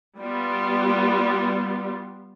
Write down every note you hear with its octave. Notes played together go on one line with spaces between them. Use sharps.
G3 B3 F4